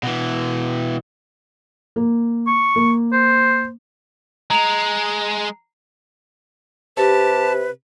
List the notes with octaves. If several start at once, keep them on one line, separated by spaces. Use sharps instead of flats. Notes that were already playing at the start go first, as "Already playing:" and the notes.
B2 E3
A#3
C#6
A#3
C5
G#3 A#5 F7
C3 G4 B4 A5